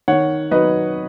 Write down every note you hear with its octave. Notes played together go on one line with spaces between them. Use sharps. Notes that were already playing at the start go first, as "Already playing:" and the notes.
D#3 C#5 F#5
F#3 D#4 B4 D#5